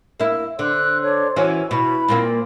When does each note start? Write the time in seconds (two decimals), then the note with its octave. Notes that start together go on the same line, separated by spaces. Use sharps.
0.20 A#3 E4
0.59 D3 C5 F#6
1.02 D4 A4 C#5
1.36 E3 C#4 F#4 G#5
1.71 B2 E4 B4 B5
2.08 A#2 A#3 C4